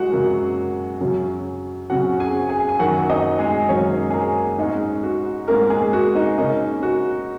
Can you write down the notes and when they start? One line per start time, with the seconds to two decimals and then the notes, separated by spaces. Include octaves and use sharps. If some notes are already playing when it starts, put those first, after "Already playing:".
Already playing: F#3 G#3 F#4 F#5
0.11 F#2 C#3 F#3 A#3
1.00 F#2 C#3 F#3 C#4
1.90 F#2 C#3 F#3 C#4 F#4 F#5
2.20 G#4 G#5
2.49 G#4 G#5
2.69 G#5
2.79 F#2 D#3 F#3 A#3 F#4 F#5
3.10 D#4 D#5
3.39 G#3 G#4
3.69 F#2 D#3 F#3 A#3 C#4 C#5
4.10 G#4
4.13 A#3 A#4
4.59 G#2 G#3 C#4 D#4
5.03 F#4
5.48 G#2 G#3 A#3 C#4 A#4
5.70 G#3 G#4
5.93 F#4
6.15 D#4
6.38 C#3 A#3 C#4 D#4
6.83 F#4